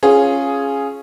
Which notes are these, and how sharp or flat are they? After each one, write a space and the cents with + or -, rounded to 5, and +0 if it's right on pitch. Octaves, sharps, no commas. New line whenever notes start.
C#4 -10 F4 +0 G#4 +0